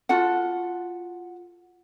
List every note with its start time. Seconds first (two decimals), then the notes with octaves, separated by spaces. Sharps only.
0.09 F4 F#4 A4 F#5